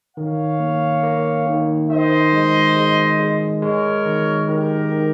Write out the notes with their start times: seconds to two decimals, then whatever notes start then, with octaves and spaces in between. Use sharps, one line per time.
0.17 D#3 C#5 F5
0.60 A#3
1.03 A#3
1.47 D#3
1.89 D#3 C5 D#5
2.32 G#3
2.76 G#3
3.19 G#3
3.62 G#3 A#4 C#5
4.06 D#3
4.48 D#3 G4 A#4
4.91 D#3